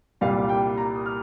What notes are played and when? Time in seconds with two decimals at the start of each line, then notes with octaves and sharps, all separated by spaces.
0.21 C2 A#2 G3 F5
0.49 G5
0.77 A#5
0.95 D#6
1.06 F6